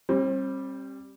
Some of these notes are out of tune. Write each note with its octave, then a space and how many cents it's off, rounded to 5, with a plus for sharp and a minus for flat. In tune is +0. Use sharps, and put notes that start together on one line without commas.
G3 +0 C4 +40